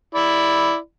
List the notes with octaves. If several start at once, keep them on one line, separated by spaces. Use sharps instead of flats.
E4 D5 B5